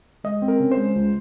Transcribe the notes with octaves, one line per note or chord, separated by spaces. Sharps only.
G#3 D#5
C4
A#4
C#3
C5
G#3
C#2